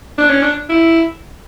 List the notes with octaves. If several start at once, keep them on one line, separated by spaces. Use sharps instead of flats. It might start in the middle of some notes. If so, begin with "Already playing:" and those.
D4
C#4
D4
E4